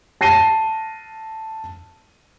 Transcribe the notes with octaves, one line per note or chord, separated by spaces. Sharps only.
A5 A#6 C7 D#7 G7